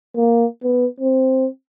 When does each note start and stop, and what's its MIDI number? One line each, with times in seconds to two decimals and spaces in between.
0.16 0.45 58
0.64 0.86 59
1.00 1.47 60